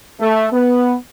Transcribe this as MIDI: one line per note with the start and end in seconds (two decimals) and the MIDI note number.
0.20 0.47 57
0.53 0.95 59